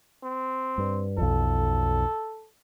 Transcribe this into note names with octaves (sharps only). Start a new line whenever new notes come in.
C4
G2
B1 F2 A4